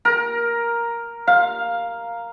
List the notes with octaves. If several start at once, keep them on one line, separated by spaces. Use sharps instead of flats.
A#4
F5